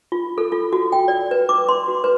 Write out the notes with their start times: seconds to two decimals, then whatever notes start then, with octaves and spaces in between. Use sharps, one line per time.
0.12 F4
0.38 A4
0.52 F4
0.73 F#4
0.92 G5
1.08 D5
1.31 B4
1.49 D6
1.69 C6
1.88 F#4
2.04 B4